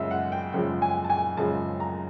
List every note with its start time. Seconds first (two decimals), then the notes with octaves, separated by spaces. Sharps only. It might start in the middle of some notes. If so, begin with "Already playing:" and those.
Already playing: F#2 C#3 F3 G#3 E5
0.11 F#5
0.32 G5
0.53 F#2 C#3 F3 G#3 G5
0.82 G#5
1.04 A5
1.10 G#5
1.37 F#2 C#3 F3 G#3 A5
1.80 A#5